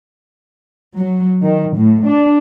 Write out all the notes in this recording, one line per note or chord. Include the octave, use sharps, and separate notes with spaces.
F#3
D#3
A2
D4